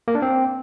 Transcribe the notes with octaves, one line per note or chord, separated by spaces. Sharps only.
A#3
D4
C4